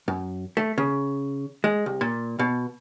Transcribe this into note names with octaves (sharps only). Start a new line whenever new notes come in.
F#2
A3
C#3
G#3
C2
A#2
B2